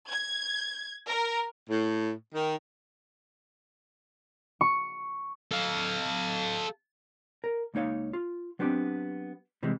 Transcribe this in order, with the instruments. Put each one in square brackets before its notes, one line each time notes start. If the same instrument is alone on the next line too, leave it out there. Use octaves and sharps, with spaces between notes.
[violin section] G#6
A#4
[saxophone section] A2
D#3
[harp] C#6
[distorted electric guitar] A4 F5
[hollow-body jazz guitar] A#4
C#2 A#3 D#4 C#5 F5
F4
F#3 B3 C4 D4 G4
C3 E3 G3 G#3